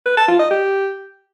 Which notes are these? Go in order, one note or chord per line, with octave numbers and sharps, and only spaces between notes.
B4
A5
F4
D#5
G4